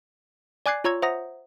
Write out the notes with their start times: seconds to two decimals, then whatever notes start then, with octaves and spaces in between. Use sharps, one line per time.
0.66 D5 G#5 D6 F#6 G#6 C7
0.84 F4 C#5 A#5 C#6 E6 G#6
1.02 C5 E5 F#5 A#5 D#6 A#6